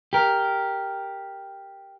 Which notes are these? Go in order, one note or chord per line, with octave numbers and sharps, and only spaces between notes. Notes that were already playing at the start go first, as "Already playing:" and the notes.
G4 A#4